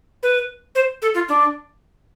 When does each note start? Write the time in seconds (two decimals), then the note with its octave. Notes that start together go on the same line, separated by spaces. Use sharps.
0.23 B4
0.75 C5
1.02 A4
1.14 F4
1.29 D4